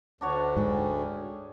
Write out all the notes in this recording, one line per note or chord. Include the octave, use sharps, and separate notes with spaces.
D2 D4 F#4 C#5
G#2 G#4 G5